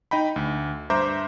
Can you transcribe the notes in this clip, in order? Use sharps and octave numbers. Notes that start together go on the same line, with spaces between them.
D#4 D#5 G5 B5
D2
G2 C5 E5 A#5 D6 G6